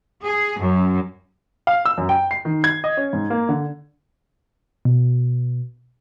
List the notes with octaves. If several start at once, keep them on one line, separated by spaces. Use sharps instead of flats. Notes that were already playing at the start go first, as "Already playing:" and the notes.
G#4
F#2
F5
E6
F#2
G5
C7
D#3
G#6
D#5
C#4
G#2
A#3
D3
B2